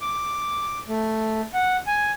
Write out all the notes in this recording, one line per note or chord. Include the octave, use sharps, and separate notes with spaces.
D6
A3
F#5
G#5